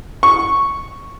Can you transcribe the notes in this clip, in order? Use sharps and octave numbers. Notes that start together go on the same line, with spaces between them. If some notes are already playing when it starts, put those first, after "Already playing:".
C#6